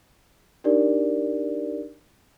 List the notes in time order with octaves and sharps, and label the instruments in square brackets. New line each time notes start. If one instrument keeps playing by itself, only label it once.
[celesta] D4 D#4 G4 A#4 D5